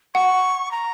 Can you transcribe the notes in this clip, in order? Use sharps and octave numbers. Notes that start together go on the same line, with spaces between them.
F#5 C#6
A#5